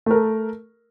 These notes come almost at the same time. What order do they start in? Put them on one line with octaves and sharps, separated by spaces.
A3 A#4 A4